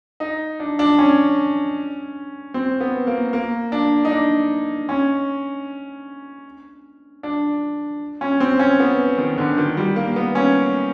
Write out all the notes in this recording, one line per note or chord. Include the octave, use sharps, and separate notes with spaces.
D#4
D4
D4
C#4
C4
B3
A#3
A#3
D4
D#4
D4
C#4
D4
C#4
C4
C#4
B3
D#3
D3
D#3
G3
A#3
B3
C#4